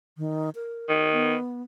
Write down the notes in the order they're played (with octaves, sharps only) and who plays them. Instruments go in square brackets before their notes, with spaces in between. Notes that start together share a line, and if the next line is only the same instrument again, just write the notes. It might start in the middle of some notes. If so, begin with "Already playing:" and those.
[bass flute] D#3
A#4
[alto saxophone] D#3
[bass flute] B3